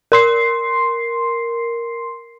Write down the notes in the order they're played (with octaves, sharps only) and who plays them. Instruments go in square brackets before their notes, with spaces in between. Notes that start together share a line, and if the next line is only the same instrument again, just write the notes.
[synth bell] A#4 C6 C7